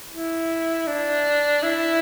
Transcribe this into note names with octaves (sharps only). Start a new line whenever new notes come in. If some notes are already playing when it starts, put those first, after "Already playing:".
E4
D4
E4